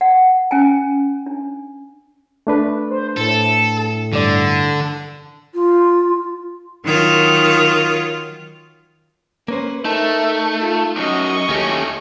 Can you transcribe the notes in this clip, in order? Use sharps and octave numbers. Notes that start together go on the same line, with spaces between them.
F#5
C#4 G5 G#5
D4
A3 D4 B4
C5
A2 A4
G2 D3 D5
F4
D#3 F#3 F4
A#3 C#4 B4 C5
A3 D#4 A#4 E5 A5
F4
B1 F#2 D#5 C#6
D#2 A3 C#4 G4